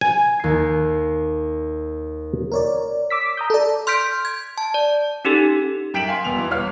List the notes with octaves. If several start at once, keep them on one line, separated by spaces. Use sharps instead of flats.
G#5
D#2 C7
A#4 C#5 D5
D6 E6 B6
A#5 D#6 G6
A4 D5
C6 F6 G6 B6 D7
G#6
A5
D5
C#4 D#4 G4 A4
F#2 G5 B6 D7 E7 F#7
F5 G#5 C6
E1 B3 F7
E3 B3
D#1 B3 C#5 F5 F6